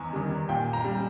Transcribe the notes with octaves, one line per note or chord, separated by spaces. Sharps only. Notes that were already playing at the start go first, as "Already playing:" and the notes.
Already playing: E2 D#3 G#5 A#5
D#3 G3
A#2 G5
A#5
G3